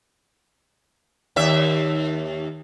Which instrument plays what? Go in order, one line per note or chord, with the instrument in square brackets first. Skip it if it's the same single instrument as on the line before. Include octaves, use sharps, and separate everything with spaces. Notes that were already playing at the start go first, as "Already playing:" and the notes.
[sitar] D#2 E5